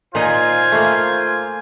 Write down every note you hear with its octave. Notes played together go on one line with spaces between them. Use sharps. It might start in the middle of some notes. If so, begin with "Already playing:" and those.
A#2 D#4 F4 C5 D#5 G#5
A3 A#3